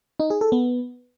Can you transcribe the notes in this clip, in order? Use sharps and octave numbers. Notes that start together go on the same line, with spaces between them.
D#4
G#4
A4
B3